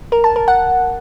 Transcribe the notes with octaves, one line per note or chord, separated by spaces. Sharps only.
A#4
A5
A#4
F#5